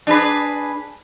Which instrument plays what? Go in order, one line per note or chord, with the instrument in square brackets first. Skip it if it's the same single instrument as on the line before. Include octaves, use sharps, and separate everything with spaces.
[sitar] D4 G#4 B4